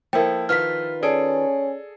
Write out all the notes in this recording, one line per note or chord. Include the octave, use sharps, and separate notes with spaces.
F3 A#3 E4 A4 A#4 G5
D#3 F4 B4 F6 B6
C#4 G#4 A4 D5 D7